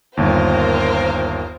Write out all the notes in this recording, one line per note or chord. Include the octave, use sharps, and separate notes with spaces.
G1 D#2 F4 A#4 C5